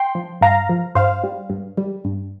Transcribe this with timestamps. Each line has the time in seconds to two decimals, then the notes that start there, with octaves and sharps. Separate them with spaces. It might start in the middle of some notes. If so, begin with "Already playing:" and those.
Already playing: G5 C6
0.15 F3
0.41 G2 F5 A#5
0.69 F3
0.95 G2 C5 F5
1.23 G3
1.50 G2
1.78 G3
2.05 G2